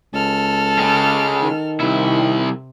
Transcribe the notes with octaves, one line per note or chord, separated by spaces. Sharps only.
C#2 A4 F6
C#3 G#3
D#3
C2 C3 E4